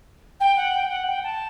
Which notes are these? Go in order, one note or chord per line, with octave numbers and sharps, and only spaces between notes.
G5
F#5
G5
F#5
G5
A5